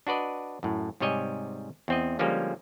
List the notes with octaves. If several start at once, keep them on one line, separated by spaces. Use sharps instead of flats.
D4 F#4 B4 D5 D#5
F#2 A2
G#2 C3 G3 C#5 D#5 G#5
E2 C4 D#5
D3 F3 G3 G#3 A#3 C#4